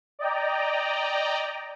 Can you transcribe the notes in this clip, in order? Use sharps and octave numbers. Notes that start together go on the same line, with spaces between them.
D5 D#5 G5 A#5